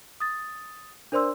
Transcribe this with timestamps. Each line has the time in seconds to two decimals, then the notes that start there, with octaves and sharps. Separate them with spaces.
0.20 D#6 A6
1.12 D4 A#4 C5 D5 C6 E6